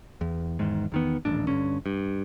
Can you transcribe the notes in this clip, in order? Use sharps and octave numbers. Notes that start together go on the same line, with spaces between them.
E2
E2 G#2 D#3
E2 D#3 B3
D#1 A1 D4
G2 D3 C#4
G2